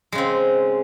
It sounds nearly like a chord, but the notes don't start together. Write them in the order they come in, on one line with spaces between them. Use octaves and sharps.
G#3 C#3 C4